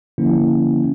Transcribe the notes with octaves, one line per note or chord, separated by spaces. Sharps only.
D3 F3 A#3 C#4 E4